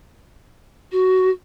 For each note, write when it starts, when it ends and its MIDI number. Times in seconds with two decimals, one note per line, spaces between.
0.92 1.30 66